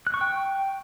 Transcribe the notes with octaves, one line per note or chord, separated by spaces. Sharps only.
F#6
C#6
G5